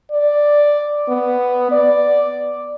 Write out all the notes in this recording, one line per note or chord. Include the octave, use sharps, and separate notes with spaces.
D5
B3
D5